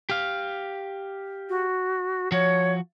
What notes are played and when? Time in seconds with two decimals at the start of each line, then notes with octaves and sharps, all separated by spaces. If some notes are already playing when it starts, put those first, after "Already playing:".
0.09 G4 F5
1.49 F#4
2.32 F3 F#4 C#5